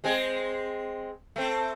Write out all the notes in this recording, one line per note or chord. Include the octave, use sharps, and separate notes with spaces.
G#3 C4 G#4
A3 C4